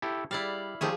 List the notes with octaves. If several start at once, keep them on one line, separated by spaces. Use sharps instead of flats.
E4 G4 A4
G3 E4 D5 F5
D#3 F3 A3 G4 G#4